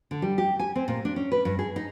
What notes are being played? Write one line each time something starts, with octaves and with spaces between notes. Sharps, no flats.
D3
G3
G4
G#5
C4
A#2
D4
C#4
B4
G2
G#4
D#4